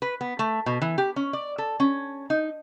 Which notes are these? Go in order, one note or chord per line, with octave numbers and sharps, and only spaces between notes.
B4
B3
A3
B2
E3
G4
C#4
D5
A4
C#4
D#4